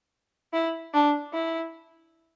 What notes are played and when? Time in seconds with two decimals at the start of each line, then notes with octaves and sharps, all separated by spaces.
0.53 E4
0.93 D4
1.33 E4